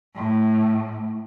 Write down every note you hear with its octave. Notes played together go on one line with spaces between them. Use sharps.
A2